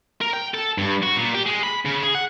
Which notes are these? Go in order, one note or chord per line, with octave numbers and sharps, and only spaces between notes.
A#4
G5
A4
G2
F#4
A#2
G4
G#3
B5
C#3
G#4
F#5